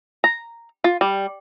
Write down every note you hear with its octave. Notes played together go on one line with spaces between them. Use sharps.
A#5
F4
G3